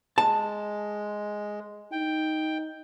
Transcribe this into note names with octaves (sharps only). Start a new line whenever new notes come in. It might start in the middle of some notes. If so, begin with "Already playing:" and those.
G#3 A5
D#4 G5